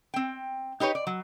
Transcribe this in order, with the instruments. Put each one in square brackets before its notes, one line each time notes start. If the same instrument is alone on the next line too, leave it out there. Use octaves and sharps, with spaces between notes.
[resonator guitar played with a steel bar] C4 G5
D#4 G4 B4 C#5
D5
F#3